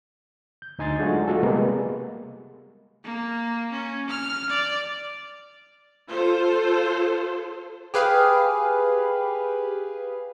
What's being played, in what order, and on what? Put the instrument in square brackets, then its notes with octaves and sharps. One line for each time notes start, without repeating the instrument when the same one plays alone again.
[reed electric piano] G6
D2 D#4 G#5 C6 A6
F#3 G#3 A3 D4 F4 F#4
G#3 A#3 F4 F#4 A4
C3 G3 G#3 A#3 B3
[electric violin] A#3
C#4
F6
D5
[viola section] F4 A4 C5
[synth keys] G4 G#4 B4 F5